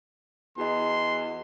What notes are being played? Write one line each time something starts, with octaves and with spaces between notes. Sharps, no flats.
E2 F#4 D#5 C6